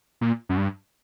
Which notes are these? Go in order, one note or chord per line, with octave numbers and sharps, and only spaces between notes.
A#2
F#2
G2